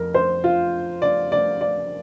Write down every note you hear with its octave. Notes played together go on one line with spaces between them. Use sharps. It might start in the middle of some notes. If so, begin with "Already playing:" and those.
Already playing: F2 A#4
C5
F4
D5
D5
D5